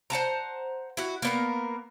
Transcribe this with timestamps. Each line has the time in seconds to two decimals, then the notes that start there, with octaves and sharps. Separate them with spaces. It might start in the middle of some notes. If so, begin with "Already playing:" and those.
0.10 C5 F#5 A5 A#5
0.97 E4 F#4
1.22 A#3 B3 A#4